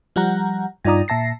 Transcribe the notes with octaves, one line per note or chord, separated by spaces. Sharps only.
F3 G3 F#5 A#5
G2 D#4 F4 D5 A#5 D#6
A#2 E5 A5 A#6 C7